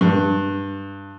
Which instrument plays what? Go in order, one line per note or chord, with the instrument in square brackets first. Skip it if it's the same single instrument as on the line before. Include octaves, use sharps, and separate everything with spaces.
[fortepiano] G2